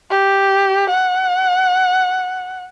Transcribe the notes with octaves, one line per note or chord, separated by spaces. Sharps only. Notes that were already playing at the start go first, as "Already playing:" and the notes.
G4
F#5